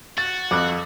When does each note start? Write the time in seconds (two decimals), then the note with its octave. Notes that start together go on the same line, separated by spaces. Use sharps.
0.18 F#4 A6
0.51 F2 D6 F#6